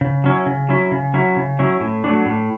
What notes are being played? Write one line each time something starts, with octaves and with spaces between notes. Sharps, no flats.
C#3
F#3 C#4 E4
C#3
F#3 C#4 E4
C#3
F#3 C#4 E4
C#3
F#3 C#4 E4
A2
F#3 A3 D4
A2